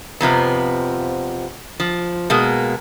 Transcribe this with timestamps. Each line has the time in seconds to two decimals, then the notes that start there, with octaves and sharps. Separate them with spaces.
0.21 F2 C3 F3 B3
1.80 F3
2.30 B2 G#3 A#3